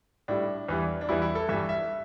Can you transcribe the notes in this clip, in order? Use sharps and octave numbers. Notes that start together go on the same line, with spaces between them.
A2 G3 D4
E2 E3 G3
D4
E2 E3 G3 E4
E4
A4
G2 E3 G3 E5
E5